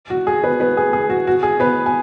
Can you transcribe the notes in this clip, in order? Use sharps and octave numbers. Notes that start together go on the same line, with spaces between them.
F#4
G#4
B3 B4
B3 B4
G#4
G#4
F#4
F#4
G#4
B3 B4
G#5